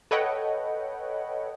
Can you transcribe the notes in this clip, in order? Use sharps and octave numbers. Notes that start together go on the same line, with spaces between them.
A4 B4 C#5 D#5 F#5 G5